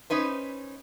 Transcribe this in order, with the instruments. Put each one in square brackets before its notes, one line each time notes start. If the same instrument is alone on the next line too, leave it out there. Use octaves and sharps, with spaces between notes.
[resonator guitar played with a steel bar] C#4 D#4 B4 C5